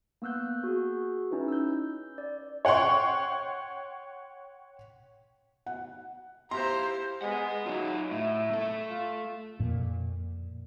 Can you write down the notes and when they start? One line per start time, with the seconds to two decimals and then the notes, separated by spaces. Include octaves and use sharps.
0.22 A#3 B3 E6 F#6 G6
0.64 F#4 G#4
1.31 C#4 D#4 E4 B4
1.48 E6 G6
2.18 D5
2.65 C#5 F#5 G5 C6 C#6
5.66 F#5
6.51 E4 G4 C5 F5 A#5 C6
7.22 G#3 B4 F#5
7.66 F#3 D#4 F4
8.11 A2 E5
8.51 A3 A4
8.90 F4
9.59 F2 A#2